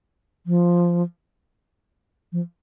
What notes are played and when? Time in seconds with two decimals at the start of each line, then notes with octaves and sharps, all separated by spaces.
0.46 F3
2.32 F3